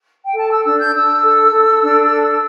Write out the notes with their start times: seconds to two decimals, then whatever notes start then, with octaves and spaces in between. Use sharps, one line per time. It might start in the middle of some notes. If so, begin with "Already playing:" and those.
0.24 G5
0.35 A4 A5
0.50 E6
0.64 D4 E6
0.78 G6
0.93 D4 E6
1.23 A4
1.51 A4
1.80 D4
2.10 A4